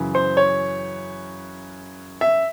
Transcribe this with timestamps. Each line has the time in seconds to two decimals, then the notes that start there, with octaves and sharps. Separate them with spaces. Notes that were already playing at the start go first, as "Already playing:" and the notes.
Already playing: F#2 C#3 E3
0.15 C5
0.37 C#5
2.21 E5